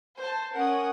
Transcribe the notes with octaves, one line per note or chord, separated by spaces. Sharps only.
C5 A5
C#4 A#4 F#5 D#6